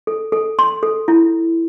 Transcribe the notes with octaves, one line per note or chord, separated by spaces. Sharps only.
A4
A4
C6
A4
E4